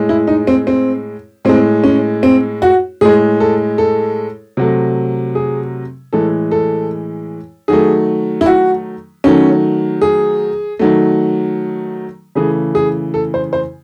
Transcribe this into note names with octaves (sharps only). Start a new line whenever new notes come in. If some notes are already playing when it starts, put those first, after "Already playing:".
Already playing: A2 G#3
E4
D#4
C4
C4
A2 G#3 C4
C#4
C4
F#4
A2 G#3 G#4
A4
A4
C3 F#3 A3
G#4
A2 E3 G#3 A4
A4
D#3 F#3 A3 G#4
E4
F#4
D#3 F#3 A3 C#4
G#4
D#3 F#3 A3
C#3 E3 A3 G#4
G#4
A4
C5
C5